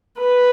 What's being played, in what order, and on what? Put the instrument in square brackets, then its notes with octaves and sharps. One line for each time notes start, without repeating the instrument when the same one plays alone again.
[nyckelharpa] B4